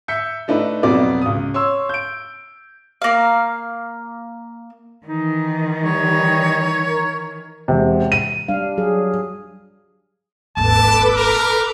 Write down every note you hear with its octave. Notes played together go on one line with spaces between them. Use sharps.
E5 G6 C#7
A3 D4 D#4 B4
F2 B2 F#3 B3 D5 D6
C#2 D#6
C#5 C6 E6
G6 D7
A#3 F5
D#3 E3 D#4
G3 C#5
A#4
E1 C3
D#7
G3 D4 F5
F#3 G#4
D#1 G#1 A4 B4 A5 D6
A#4